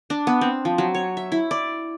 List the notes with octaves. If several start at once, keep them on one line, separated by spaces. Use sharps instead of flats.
D4
B3
C4
F3
F#3
C#5
E5
E4
D5